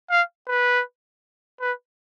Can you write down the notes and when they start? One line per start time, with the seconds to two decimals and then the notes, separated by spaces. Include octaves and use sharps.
0.10 F5
0.48 B4
1.61 B4